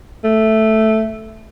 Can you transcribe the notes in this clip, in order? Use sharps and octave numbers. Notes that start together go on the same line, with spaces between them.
A3